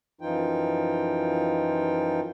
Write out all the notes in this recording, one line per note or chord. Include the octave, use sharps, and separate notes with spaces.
F#2 E3 F3 D#4 F4 G5